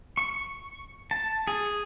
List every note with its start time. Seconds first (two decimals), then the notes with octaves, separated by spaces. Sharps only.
0.17 C#6
1.11 A5
1.47 G#4